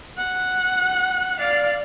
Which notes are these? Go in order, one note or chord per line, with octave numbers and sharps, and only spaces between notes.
F#5
D5 F5